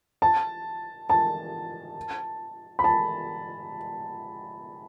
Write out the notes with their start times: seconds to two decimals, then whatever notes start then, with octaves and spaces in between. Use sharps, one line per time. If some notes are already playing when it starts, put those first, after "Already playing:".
0.22 A5
1.10 A5
2.79 B5
2.84 A5